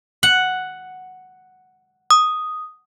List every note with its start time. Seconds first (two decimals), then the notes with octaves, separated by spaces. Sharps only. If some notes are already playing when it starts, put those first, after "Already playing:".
0.23 F#5
2.11 D#6